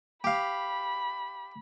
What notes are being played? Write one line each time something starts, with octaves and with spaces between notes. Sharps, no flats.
G4 F5 B5